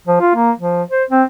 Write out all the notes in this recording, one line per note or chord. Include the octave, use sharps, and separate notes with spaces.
F3
F4
A#3
F3
C5
C4